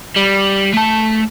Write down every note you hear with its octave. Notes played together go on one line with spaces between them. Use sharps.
G3
A3 A5